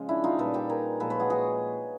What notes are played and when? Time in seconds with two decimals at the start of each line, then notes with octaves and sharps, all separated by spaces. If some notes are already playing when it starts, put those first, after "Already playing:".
Already playing: C#3 F3 G#3
0.09 D4 E4
0.24 D#4 F4
0.38 A#2 G3 A4 B4
0.54 G4 A4
0.69 G#4 A#4
1.00 A#2 F3 G#3 A4 B4
1.10 B4 C#5
1.20 F#4 G#4
1.30 F#4 G#4